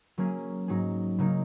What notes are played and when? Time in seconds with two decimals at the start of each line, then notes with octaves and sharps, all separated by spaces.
0.18 F#3 A#3 C#4 G#4
0.68 G#2 F#3 D#4 G#4
1.18 C#3 F#3 A#3 D#4